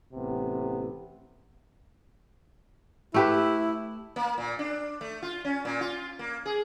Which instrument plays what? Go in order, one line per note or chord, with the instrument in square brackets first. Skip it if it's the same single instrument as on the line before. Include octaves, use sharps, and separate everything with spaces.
[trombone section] A1 C3 B3
[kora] A3 G4 B4 [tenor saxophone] E4
[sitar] A#3
A#2
D4
A3
F4
C#4
A#2
F4
A#3
G#4